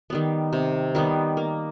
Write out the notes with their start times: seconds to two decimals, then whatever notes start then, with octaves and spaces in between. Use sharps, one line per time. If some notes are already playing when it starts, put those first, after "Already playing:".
0.10 D#3 G3 B3
0.53 C3
0.95 D#3 G3 B3
1.37 A#3